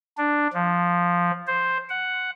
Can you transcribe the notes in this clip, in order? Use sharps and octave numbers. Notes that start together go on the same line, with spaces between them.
D4
F3
C5
F#5